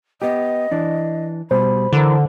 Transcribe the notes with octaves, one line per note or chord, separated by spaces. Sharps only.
B3 G4 D#5
E3 D4
B2 G3 C5 B5
D3 E3 A#4